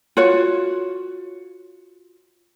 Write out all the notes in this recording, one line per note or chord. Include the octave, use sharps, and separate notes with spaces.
F4 F#4 C#5